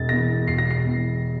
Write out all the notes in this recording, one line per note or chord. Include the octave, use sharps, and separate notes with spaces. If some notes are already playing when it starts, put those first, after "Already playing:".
Already playing: E1 A6
E2 E3 A#6
E1 C7
A#6
C7
E2 E3